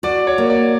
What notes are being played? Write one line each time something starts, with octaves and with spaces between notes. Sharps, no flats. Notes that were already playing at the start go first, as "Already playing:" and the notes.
F#4 D5
C#5
A#3
D5